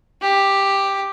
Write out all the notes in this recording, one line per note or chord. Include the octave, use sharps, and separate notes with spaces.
G4